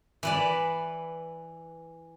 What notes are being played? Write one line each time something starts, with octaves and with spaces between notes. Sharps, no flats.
E3 B4 D5